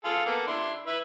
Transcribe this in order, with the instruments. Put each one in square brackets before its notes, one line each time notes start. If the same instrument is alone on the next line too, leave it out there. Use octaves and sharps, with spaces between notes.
[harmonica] F4 G#4 A4
A#3 B3 A4
D4 E4 C6
E4 B4 E5